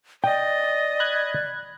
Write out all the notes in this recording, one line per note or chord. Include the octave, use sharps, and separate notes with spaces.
D5 D#5 G5
B5 F#6 G#6